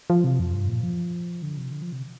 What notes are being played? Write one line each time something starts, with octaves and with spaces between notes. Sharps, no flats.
F3
C3
F2
G2
A#2
F3
D3
C3
D3
F3
C3